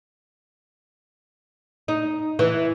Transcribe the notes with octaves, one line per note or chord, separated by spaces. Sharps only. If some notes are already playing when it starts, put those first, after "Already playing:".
D#4
E3